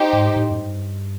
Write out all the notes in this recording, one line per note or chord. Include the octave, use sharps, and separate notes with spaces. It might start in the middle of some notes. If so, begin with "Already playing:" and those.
Already playing: D#4 G4 C5
G#2
A2
F#2
G2